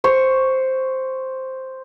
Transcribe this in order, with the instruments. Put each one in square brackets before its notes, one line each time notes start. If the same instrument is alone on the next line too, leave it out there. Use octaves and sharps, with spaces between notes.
[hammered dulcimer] C5 C#6